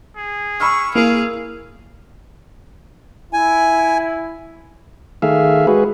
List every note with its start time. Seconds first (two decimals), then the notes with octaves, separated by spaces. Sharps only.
0.16 G#4
0.60 B5 C#6 E6 F6
0.95 A#3 E4 G#4 A#4 F5
3.33 E4 G#5
5.22 D#3 A3 G#4 E5 F5
5.67 G#3 F#4 G#4 B4